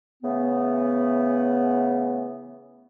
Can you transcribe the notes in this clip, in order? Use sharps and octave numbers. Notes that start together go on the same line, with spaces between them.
C#3 E3 A3 B3